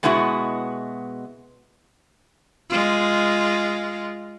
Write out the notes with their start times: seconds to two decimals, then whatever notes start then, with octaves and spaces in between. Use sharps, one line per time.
0.03 B2 G#3 B3 E4 F#4
2.70 G#3 F4